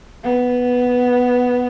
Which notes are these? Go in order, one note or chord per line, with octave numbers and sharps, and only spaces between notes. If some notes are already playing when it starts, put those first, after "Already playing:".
B3